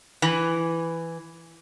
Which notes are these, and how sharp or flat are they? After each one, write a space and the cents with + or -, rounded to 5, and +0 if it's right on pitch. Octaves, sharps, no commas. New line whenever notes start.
E3 +10